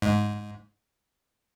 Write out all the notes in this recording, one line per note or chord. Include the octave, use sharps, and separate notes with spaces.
G#2